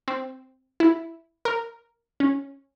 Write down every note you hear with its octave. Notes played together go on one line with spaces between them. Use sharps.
C4
E4
A#4
C#4